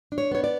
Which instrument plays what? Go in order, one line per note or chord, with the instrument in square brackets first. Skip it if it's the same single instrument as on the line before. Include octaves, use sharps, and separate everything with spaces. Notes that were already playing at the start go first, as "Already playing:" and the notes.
[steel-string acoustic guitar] D4
C#5
B3 C#5
D5